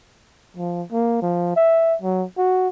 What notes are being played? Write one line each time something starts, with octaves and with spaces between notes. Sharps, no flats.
F3
A#3
F3
E5
F#3
F#4